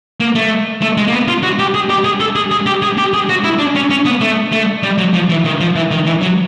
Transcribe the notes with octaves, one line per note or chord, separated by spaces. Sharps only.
A#3
A3
A3
G#3
A#3
B3
F4
F#4
G4
G#4
G4
G#4
A4
G#4
G#4
G4
G#4
G4
G#4
F#4
E4
D4
C#4
C#4
B3
A3
A3
G3
F#3
F3
E3
D#3
F3
E3
D#3
E3
F#3